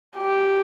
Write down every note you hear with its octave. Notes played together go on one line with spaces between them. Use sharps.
G4